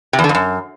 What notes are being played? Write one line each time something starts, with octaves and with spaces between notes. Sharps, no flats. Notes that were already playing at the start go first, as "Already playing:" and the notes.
C3
E2
D3
F2
F#2